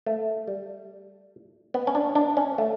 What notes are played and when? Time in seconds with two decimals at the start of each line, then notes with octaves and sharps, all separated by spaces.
0.06 A3
0.48 G3
1.74 B3
1.87 C#4
1.95 D4
2.15 D4
2.37 C#4
2.58 A3